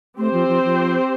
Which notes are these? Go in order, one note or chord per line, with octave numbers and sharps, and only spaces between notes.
A3 C4 G4 C5
F3
F3
F3